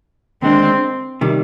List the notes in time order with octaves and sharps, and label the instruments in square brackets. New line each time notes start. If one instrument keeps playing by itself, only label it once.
[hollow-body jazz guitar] D#2 D3 G#3 D4 [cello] C4
[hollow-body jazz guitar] C3 D#3 G3